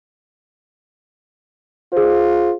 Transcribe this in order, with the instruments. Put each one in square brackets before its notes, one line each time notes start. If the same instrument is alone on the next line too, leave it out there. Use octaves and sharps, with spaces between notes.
[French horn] F4 [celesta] G#4 C5